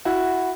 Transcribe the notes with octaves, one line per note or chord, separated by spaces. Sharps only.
E4 F#4